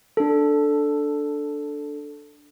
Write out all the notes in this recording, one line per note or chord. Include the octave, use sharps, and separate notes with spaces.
D4 A4